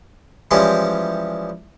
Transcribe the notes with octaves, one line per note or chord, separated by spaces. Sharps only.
E3 F3 G3 G#3 C#4 E4